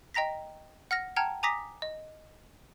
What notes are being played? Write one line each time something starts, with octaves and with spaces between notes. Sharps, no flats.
D#5 G5 A#5 A#6 B6
F#5 F6 A#6
F#5 G5 A5 A#5 F6 G#6
G#5 A#5 D6 D#6 A#6 B6
D#5